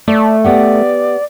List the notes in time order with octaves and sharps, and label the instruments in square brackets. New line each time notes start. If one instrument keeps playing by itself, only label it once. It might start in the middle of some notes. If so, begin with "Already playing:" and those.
[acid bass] A3 [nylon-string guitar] D5
[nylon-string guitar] B3 G4 F#5 [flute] D5